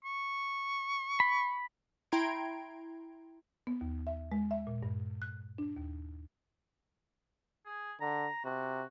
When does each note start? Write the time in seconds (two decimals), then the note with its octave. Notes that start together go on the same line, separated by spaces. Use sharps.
0.05 C#6
1.20 B5
2.12 E4 G5 A#5 C6 G#6 D7
3.67 B3
3.81 D#2
4.07 E5
4.32 G#3
4.51 E5
4.67 A#2
4.83 G2
5.22 F#6
5.58 D4
5.76 D#2
7.66 G#4
8.01 D3 A#5
8.45 C3 F#4